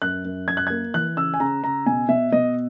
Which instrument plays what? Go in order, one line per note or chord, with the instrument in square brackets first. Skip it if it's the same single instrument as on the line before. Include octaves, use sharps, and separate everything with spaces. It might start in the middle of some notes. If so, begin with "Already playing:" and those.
[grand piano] F#2 F#6
F#2
F#2 G#6
F#6
A#3 G#6
E3 F#6
C#3 E6
G#5
C#3 A#5
C#3 A#5
B2 G#5
B2 E5
B2 D#5